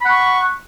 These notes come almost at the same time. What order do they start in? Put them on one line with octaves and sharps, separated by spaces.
B5 F#5 C#6